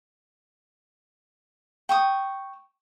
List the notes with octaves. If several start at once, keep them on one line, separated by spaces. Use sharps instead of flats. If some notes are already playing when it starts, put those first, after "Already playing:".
G5 C#6 D#6